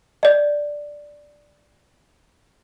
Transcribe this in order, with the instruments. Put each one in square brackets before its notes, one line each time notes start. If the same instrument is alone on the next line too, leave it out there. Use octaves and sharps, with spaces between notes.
[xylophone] D5 D#5